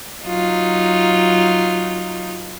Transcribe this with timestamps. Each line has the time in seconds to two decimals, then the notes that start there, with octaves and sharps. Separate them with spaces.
0.24 F#3 D#4 F4